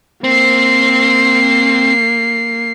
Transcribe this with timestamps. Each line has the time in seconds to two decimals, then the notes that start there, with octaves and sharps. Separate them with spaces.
0.24 A#3 C4 C7